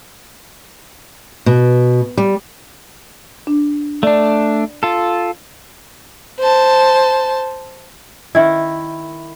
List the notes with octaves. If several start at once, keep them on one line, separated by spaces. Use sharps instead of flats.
B2
G3
D4
A3 D4 D5
F4 A4
C5 A5
D#3 E4